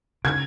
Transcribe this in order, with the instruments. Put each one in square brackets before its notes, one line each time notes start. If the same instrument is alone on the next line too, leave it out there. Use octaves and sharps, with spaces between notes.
[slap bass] C#3 [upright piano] G#6